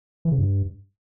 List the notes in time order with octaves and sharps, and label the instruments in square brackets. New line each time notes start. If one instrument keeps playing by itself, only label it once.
[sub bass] E3
C#3
G2